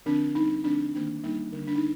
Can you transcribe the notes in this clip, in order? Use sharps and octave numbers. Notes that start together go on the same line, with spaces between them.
D3 F3 C4 D4
G3 C4 D#4
D3 F3 A3 C4 D4
D#3 A#3 D4
G3 A#3 D4 D#4
D3 G3 A#3 D4
D4
D#4